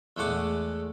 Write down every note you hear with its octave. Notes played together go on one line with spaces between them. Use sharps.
E2 G#3 A3 F#5 D6